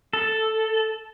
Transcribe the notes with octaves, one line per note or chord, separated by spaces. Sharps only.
A4